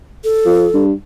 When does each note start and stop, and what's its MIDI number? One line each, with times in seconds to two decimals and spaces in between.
0.24 0.84 69
0.45 0.66 53
0.74 0.92 43